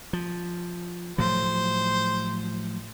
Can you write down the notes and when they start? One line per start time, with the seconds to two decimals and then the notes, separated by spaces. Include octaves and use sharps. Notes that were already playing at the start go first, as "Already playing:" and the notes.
0.13 F3
1.18 A2 F3 F#3 C5